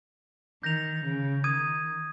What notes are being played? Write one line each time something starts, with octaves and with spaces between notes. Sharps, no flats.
D#3 G6 A#6 F7
C#3
D#3 D#6 G#6 D#7